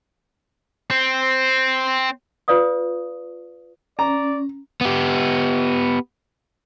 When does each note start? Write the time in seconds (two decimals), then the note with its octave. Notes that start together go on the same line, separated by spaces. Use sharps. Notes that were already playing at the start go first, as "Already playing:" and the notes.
0.90 C4
2.48 F4 B4 D5 F5 D#6
3.99 C#4 D5 A#5
4.81 B3 G4